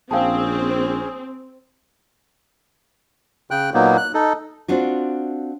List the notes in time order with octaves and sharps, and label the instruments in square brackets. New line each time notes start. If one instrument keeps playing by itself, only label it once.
[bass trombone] A#1 [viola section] C4 [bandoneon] C#4 G#4 [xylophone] F5 G5 A5
[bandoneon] C#3 G5 F#6
A#2 F#3 A#3 B3 D#4
F#6
D#4 A4
[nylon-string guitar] C4 D4 F4 F#4